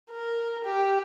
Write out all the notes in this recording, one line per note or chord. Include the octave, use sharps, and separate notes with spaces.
A#4
G4